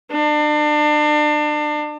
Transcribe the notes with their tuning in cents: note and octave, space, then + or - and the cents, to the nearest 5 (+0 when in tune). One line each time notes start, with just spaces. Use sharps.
D4 +35